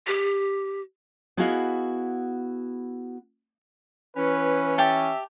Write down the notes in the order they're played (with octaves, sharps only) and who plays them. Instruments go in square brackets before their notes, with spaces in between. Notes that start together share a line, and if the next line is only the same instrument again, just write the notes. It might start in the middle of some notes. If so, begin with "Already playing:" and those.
[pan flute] G4
[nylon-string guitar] B3 E4 F#4 G#4 D#5 F5
[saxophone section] E3 C#4 [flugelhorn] B4
[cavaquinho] G4 G5 A5 [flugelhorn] E5